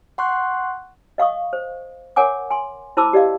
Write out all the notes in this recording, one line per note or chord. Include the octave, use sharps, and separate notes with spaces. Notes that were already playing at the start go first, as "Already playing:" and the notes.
F#5 C6 C#6 F#6
D#5 F5 C#6 D#6
C5
A#4 C#5 F#5 G#5 D6
G#5 C6
E4 C5 A5 B5 D6 E6
G4 D5 D#5 F5